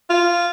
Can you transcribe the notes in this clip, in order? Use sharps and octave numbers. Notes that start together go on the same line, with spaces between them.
F4